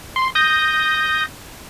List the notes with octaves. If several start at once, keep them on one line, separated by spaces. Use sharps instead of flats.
C6
D#6 G6 A#6